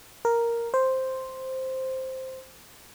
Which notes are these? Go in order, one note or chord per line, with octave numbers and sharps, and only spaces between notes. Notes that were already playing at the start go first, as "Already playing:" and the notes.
A#4
C5